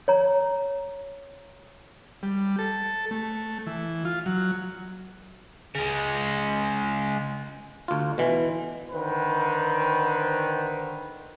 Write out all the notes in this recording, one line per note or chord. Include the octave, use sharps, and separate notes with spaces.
C#5 A#5
G3
A4
A3
E3
F4
F#3
C#3 G#3
D2 F4
B2 E3
D3 D#3 B4 C5